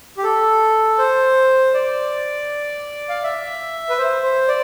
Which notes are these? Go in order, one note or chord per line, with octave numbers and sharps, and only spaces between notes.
G4
A4
C5
D5
F5
E5
B4
C5
C5
D5